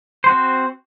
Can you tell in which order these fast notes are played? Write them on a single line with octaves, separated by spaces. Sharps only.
C5 F#4 C4